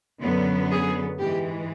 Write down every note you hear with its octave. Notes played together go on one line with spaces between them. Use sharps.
F#2 D3 F#3 B3
G#4
G#2 E3 G#3 G4